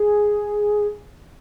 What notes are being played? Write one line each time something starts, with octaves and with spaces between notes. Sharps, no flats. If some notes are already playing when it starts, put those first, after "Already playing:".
Already playing: G#4